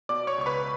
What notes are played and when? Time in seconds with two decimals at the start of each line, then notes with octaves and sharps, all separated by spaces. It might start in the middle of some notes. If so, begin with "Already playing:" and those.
0.09 B2 D5 D6
0.27 C#5 C#6
0.38 C#2 C#6
0.46 B4 B5